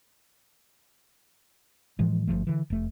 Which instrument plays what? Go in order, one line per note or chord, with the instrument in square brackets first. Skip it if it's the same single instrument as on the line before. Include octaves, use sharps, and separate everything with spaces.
[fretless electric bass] A2 E3 F3 G#3
G1 D#2 F3 A3
D3 E3
F1 A3